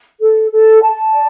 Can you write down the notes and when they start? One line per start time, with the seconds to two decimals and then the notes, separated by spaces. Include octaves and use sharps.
0.20 A4
0.51 A4
0.82 A5
1.13 D5